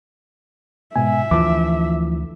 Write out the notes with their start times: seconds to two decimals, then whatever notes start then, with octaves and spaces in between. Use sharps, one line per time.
0.96 G#2 B2 E5 G#5
1.31 D2 E3 F3 D6